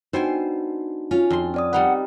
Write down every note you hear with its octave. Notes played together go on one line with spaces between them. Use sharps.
B3 D4 D#4 F#4 C5 G5 G#5
C#4 F4
F2 C6
C4 D5 D#6
G3 D#4 B4 F#5